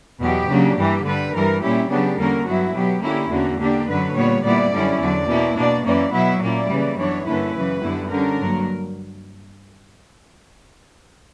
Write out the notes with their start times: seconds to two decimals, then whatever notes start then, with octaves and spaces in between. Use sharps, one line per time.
0.21 E2 B2 F#3 B3 G4
0.49 C#3 F#3 A#3 D4
0.77 G2 E3 A#3 G4
1.05 G2 D3 G3 B4
1.34 G2 E3 G3 A#4
1.62 A#2 G3 C#4 E4 G4
1.89 C#3 F#3 B3 D4 G4
2.18 E2 D3 G3 A#3 C#4 A#4
2.46 G2 F#3 B3 E4 F#4
2.74 B2 F#3 B3 G4
3.02 D3 A#3 C#4 E4 G4
3.30 E2 D3 A#3 C#4 F#4
3.59 D3 A#3 D4 G4
3.87 F#2 D3 F#3 B4
4.15 A#2 G3 B3 C#5
4.43 A#2 G3 B3 E4 D5
4.72 F#2 D3 G3 C#4 E4
5.00 E2 D3 F#3 D5
5.28 B2 A#3 C#4 E4
5.56 B2 A#3 D4 D5
5.84 F#2 E3 A#3 C#4 D5
6.13 B2 F#3 B3 E4 E5
6.41 A#2 A#3 C#4 E4 D5
6.70 C#3 E3 G3 A#3
6.97 F#2 E3 B3 D4 C#5
7.25 G2 D3 A#3 C#4 E4 B4
7.55 F#2 C#3 E3
7.82 F#2 D3 G3 B3 E4
8.10 D3 G3 C#4 A#4
8.39 G2 F#3 A#3